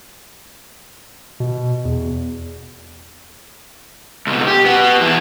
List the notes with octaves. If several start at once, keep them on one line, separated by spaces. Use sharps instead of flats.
B2
E2
C#2 B2
G4
B3 F#4
E2 E4